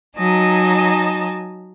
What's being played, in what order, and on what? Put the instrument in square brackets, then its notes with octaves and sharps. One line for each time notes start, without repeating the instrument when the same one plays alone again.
[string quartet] F#3 D#4 D#5 G#5 A5